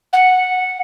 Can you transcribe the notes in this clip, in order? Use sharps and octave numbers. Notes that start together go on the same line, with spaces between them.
F#5